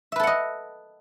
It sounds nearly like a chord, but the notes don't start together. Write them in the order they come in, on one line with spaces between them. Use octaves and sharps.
E5 B4 A4 F#5 D#5